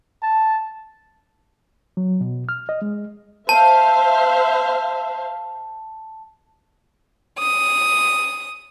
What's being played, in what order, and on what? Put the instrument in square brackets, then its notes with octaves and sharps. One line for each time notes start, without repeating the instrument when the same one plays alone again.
[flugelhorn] A5
[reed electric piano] F#3
B2
F6
D#5
G#3
[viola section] C5 E5 F5 [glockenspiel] A5
[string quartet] D#6